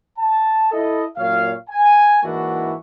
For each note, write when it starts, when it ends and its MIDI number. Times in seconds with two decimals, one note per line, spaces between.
0.18 0.71 81
0.72 1.04 64
0.72 1.04 69
0.72 1.04 75
1.17 1.53 42
1.17 1.53 46
1.17 1.53 54
1.17 1.53 73
1.17 1.53 77
1.70 2.21 80
2.23 2.74 44
2.23 2.74 52
2.23 2.74 58
2.23 2.74 62
2.23 2.74 64
2.23 2.74 66